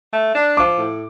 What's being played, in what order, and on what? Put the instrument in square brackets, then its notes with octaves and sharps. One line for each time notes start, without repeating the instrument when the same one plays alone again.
[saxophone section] A3
D4
[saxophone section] F3 [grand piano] D6
[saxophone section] A2